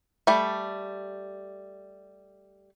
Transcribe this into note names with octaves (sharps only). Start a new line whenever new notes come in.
G3 A3